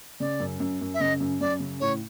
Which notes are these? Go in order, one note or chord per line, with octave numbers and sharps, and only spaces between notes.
C#3 D5
F#2
F#2
F#2
E5
C#3 D#5
F#2
F#2 D5
C#3
A2 C#5